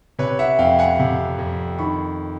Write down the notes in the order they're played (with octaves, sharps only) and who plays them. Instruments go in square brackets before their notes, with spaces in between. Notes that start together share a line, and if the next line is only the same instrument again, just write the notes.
[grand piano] C3 B4 C#5
E5 F#5
F2 F5 G5
F#5 G#5
C3
F2
D#3 B5 C#6